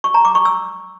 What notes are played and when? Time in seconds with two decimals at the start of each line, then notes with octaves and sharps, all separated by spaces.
0.04 C#6
0.14 A#5
0.25 D6
0.35 C#6
0.45 E6